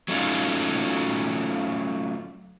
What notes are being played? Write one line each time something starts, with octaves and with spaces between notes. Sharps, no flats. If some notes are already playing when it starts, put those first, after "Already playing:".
F#3 A3 C#4 D#4 F4